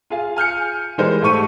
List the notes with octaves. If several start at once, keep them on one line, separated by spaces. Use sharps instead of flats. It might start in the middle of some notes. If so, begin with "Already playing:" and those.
F4 G#4 F5
G#5 F6 G6 C#7
E3 G3 G#3 D#4 A#4 C5
G#2 A3 G4 C#6 D#7